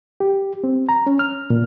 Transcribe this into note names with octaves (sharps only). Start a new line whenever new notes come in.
G4
C4
A#5
C#4
F6
A#2